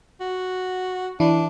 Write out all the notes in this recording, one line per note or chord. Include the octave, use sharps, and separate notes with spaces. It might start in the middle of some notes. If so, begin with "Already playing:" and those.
F#4
E3 D4 E4